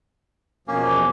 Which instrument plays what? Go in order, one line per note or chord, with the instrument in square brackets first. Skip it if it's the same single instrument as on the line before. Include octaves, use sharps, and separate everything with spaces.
[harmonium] E2 B2 F3 [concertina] A#3 C#4